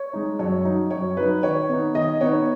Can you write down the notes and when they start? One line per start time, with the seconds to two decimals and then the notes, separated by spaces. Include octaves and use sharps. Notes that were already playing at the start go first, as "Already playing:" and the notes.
Already playing: C#5
0.13 G#3 D#4
0.39 F#2 C#5
0.65 F#3 D#4
0.91 F#2 C#5
1.17 F#3 D#4 B4
1.43 D#3 C#5
1.69 B3 D#4
1.95 D#3 D#5
2.21 B3 D#4 C#5